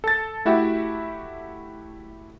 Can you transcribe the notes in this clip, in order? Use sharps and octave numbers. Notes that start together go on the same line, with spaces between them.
A4 A6
A3 E4 F#4 G4 E5